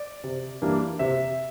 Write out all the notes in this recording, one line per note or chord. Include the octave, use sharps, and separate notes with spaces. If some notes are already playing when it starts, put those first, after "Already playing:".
Already playing: D5
C3
E3 G3 A#3 D4
C3 E5